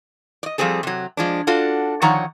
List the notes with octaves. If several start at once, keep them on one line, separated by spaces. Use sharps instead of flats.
D5 D#5
F3 G3 C4 G#4 A4
C3 F#3
F3 G#3 D4
D4 F4 F#4 A4
D3 D#3 F3 C#5 F#5 A#5